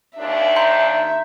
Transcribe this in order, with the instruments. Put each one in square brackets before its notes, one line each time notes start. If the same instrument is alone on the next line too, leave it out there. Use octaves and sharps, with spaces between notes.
[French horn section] D#2 D4 [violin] E5
[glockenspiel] A#5 C6 G6